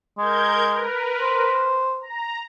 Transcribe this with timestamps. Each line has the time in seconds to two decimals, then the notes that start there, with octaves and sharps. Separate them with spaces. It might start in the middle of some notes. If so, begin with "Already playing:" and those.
0.18 G#3 A#4 G6 G#6
0.71 A#4 B4
1.21 C5
2.01 A#5